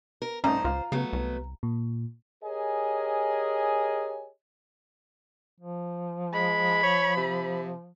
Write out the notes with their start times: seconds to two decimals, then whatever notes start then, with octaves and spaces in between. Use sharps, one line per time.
0.22 A#4
0.44 C2 A3 C#4 D#4 C5 A#5
0.64 C#2 F4
0.92 C#3 F#3 A3 B3
1.13 C2
1.63 A#2
2.43 G4 G#4 A#4 C#5 D#5 G#5
5.60 F3
6.34 G#3 B5
6.83 C#5
7.17 C3